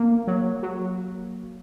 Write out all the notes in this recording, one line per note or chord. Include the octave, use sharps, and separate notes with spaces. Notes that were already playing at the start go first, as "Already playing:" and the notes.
Already playing: A#3
F#3
F#3